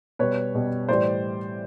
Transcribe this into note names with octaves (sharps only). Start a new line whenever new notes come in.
B2 G3 B4 C#5
B2 G3
A2 E3 G3 C5 D5